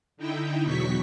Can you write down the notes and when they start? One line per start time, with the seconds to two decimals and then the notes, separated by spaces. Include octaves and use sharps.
0.17 D3 D#4 E4 G5
0.63 E2 B2 F#3 C#6 B6